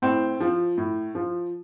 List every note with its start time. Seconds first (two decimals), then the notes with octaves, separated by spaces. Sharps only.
0.02 A2 C4
0.40 F3
0.78 A2
1.15 F3